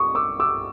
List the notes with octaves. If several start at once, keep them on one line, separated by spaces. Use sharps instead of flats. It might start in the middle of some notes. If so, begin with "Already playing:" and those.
Already playing: C#6 D#6
D6 E6
D6 E6